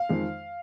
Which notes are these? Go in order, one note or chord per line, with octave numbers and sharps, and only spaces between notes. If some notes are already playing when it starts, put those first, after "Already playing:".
Already playing: F5
F2 D#3 G#3